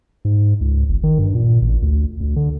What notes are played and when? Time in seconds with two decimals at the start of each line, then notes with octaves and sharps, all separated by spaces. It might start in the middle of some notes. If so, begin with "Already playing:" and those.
0.25 G#2
0.61 C#2
0.89 G1
1.03 D#3
1.19 G2
1.35 A#2
1.61 A1
1.82 D2
2.21 D2
2.36 D3